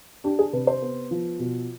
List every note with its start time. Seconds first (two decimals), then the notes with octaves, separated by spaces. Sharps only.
0.24 D4 G4
0.39 G#4
0.53 C3 B4
0.67 C5
0.82 B3
1.11 F3
1.39 B2